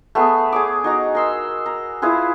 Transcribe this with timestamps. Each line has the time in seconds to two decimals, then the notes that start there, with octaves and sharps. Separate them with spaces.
0.15 A3 B3 G#4
0.53 G#4 C#5 D6
0.84 D#4 F#4 A#5
1.15 A#4 C6 E6
1.66 A#5
2.02 E4 F4 G#4 B4